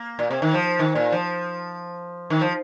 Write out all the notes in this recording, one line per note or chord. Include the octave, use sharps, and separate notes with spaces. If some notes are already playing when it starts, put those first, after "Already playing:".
Already playing: A#3
A#2
C3
D#3
F3
D#3
A#2
F3
D#3
F3